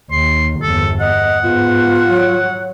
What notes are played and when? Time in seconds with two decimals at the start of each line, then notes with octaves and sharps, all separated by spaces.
0.11 D#2 D#3 C6
0.62 G1 E2 A4
1.00 D#5 F#5
1.43 G#2 B3 F4
2.11 F#3